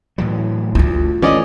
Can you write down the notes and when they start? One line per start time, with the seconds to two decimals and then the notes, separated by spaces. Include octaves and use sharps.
0.18 A2 E3 F#3
0.75 D2 E4 F4
1.22 E3 G3 A3 C#4 D5 D#5